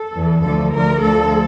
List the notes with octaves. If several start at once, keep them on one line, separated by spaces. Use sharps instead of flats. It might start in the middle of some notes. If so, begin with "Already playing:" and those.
Already playing: A4
E2 E3
D2 D3 F3 A4
D2 D3 F3 A#4
D2 D3 F3 A4